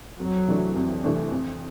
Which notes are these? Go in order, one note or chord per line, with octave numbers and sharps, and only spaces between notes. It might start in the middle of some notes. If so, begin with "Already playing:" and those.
F2 F#3
C3 E3 A3 D4
F2
C3 E3 A3 D4
F2